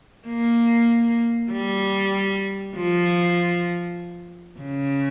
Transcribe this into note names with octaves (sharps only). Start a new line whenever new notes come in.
A#3
G3
F3
C#3